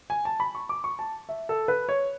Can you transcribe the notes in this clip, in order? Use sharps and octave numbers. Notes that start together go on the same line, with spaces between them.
G#5
A5
B5
C#6
D6
C#6
A5
E5
A4
B4
C#5